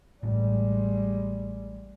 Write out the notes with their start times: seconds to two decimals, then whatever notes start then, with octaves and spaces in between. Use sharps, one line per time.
0.23 A1 A2 G3 G#3